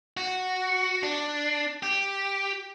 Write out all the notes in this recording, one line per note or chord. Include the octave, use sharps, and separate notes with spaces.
F#4
D4
G4